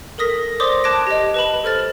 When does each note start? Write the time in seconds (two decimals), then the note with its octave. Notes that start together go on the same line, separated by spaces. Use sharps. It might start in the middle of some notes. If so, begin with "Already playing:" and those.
0.18 A4 A#4 D#6 A#6 B6
0.60 C5 D5 C6 D6 D#6 A#6
0.84 A5 D6 F#6 G#6 A#6 D7
1.07 G4 D#5
1.34 B4 A5 B5
1.64 A4 C5 F6 A6